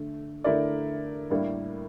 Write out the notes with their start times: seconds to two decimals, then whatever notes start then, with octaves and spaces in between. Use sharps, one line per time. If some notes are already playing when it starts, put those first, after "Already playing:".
Already playing: D3 A3
0.44 D3 A3 E4 A#4 D5
1.30 A2 G3 A#3 D4